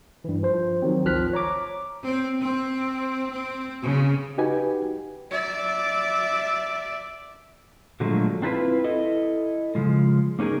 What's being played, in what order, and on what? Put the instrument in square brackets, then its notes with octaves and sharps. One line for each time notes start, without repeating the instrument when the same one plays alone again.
[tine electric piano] G2 E3
F3 C5
D#3 F#3 C4
G#1 D2 F3 F6 F#6 B6
C#5 A#5 D6
[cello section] C4
C4
C4
C#3
[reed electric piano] D#4 F#4 G4 B4 G#5
[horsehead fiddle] D5 E5
[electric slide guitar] A#2 D3 F3 F#3 G#3 A3
C4 D4 E4 F4 B4
E4 A4 D#5
C#3 F3 G#3
A#3 C#4 D#4 G#4 A#4